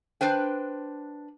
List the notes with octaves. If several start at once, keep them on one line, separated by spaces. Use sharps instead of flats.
D4 B4 C5 G5